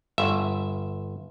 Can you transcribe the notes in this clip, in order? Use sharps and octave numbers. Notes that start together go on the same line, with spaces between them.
G1 E5